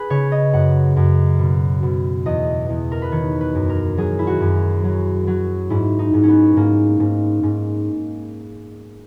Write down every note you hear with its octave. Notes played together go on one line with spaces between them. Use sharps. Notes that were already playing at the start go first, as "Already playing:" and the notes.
Already playing: G#4 B4
C#3 C#5
D#5
F#2 F#5
F#2
B2
B2
E2 D#5
E2
A#4
B4
D#3 C#5
B4
F#2
A#4
F#3 G#4
E4
F#4
F#2
F#3
F#3
G#2 E4
D#4
G#2
B3 C#4
G#2 A#3
G#2
G#2